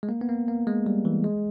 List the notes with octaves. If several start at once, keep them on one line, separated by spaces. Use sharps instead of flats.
G#3
A#3
B3
A#3
A#3
G#3
G3
E3
G#3